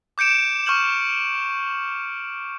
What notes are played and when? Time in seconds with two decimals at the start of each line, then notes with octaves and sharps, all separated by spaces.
0.18 D6 G6 C#7 D7 E7
0.66 C#6 F6 G6 F#7